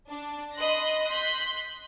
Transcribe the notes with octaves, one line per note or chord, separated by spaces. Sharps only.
D4
D#5 B5 C6 F#6 A#6
C6 F#6 G6 B6